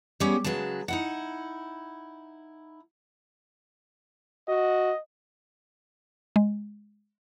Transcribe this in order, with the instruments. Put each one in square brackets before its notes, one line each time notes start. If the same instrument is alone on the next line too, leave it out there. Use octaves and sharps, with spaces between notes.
[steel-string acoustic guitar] G3 G#3 B3 C#4 G4
C#3 F#3 G#3 B4 A5
D#4 E4 F#5
[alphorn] F#4 [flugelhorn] D#5
[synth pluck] G#3